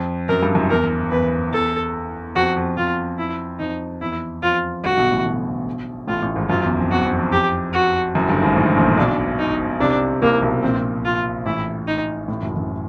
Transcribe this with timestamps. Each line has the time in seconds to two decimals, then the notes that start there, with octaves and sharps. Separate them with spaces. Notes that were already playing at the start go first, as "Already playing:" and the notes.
Already playing: F2
0.29 F#2 A#4
0.43 G2
0.55 F#1 F#2
0.70 E2 A#4
1.11 E2 B4
1.53 E2 A4
2.36 F2 F#4
2.56 F2
2.77 F2 F4
3.19 E4
3.59 F2 D#4
4.01 E2 E4
4.42 F2 F4
4.84 G1 G2 F#4
4.97 B1 B2
5.11 A1 A2
5.25 B1 B2
6.08 A1 A2 F4
6.22 A1 A2
6.36 G#1 G#2
6.49 F#1 F#2 F4
6.63 E2
6.77 F2
6.91 E2 F#4
7.05 F2
7.19 F2
7.32 G4
7.73 F#4
8.15 F#1 F#2
8.29 G1 G2
8.43 G#1 G#2
8.56 A1 A2
8.76 A#1 A#2
8.97 B1 B2 D4
9.39 D#4
9.80 C2 C3 D4
10.21 C2 C3 A#3
10.42 B1 B2
10.63 A#1 A#2 C4
11.05 F4
11.46 A1 A2 E4
11.88 D#4
12.28 A1 A2
12.42 F#1 F#2
12.56 F#1 F#2